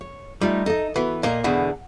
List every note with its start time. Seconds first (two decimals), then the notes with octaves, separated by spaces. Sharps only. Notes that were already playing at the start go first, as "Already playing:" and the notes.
0.01 C#5
0.41 G3 A3 D#4 F4
0.66 D#4 A4 D#5
0.96 E3 B3 F#4
1.23 A#2 A#3 A#4 D#5
1.44 E2 B2 D3 F#5